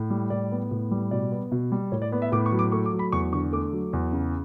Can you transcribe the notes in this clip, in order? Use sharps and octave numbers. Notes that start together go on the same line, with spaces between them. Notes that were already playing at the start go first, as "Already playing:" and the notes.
Already playing: A2
G3
A2 D5
B3
A2
G3
B2 D5
B3
B2
G3
A2 C#5
D5
B3 D5
E5
A2 D6
C#6
F#3
D6
A3 C#6
D6
F#3
B5
E2 C#6
D3 C#6
A3 D6
F#3
E2
C#3